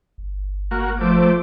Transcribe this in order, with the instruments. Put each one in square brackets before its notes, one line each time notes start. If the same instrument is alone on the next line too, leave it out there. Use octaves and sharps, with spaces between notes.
[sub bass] G1
[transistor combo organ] A#3 F#4
[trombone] F3 [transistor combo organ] A3 [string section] C5 D6